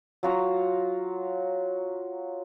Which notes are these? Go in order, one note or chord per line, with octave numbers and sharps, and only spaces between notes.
F#3 F4 F#4 A#5